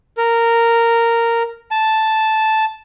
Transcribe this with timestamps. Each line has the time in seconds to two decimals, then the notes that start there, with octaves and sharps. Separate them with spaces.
0.17 A#4
1.71 A5